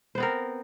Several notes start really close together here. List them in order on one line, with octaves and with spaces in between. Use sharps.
C5 B3 C4 A#4